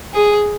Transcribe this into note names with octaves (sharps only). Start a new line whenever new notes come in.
G#4